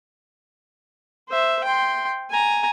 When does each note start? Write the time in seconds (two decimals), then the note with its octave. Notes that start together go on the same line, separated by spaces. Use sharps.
1.29 C5 E5
1.64 G5 C6
2.30 G#5 A#5